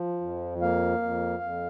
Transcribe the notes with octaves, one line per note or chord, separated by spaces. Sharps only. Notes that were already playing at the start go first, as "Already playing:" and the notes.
Already playing: F3
F2
A#3 F5
F2
F2